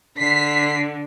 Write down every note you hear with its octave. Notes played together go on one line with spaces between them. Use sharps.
D3 B6 C7